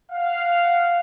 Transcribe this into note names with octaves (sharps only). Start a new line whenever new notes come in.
F5 F#5